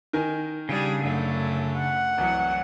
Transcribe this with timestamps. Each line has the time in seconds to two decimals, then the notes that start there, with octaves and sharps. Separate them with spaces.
0.13 D#3 A#4 G#5
0.69 C#3 G3 D4 G#4
1.02 F#2 D3 A3
1.77 F#5
2.18 C2 E3 F#3